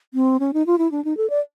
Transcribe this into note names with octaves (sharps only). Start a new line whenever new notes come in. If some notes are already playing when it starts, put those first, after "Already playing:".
C4
C#4
D#4
F4
E4
D4
D#4
A4
D5